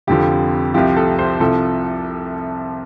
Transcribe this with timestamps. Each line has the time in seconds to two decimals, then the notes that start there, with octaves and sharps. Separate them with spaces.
0.07 F1 F2 D3 F3 G4
0.74 C2 C3 F3 G4
0.97 A4
1.19 C5
1.40 C2 C3 F3 A4